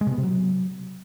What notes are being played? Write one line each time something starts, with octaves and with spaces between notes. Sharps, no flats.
G#3
C3
B3
C3
F#3